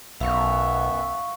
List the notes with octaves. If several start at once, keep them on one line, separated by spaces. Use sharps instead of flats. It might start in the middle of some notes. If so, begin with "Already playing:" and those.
B1 F#2 B3 E5 F5 C#6